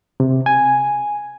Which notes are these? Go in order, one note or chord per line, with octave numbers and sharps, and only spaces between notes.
C3
G#5